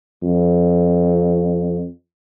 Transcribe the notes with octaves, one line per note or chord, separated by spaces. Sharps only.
F2